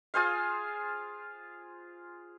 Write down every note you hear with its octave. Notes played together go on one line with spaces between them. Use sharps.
F4 G#4 C5 F5